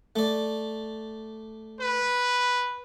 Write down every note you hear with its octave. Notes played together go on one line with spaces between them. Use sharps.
A3 D5
B4